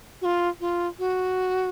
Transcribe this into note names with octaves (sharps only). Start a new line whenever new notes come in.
F#4
F4
F4
F#4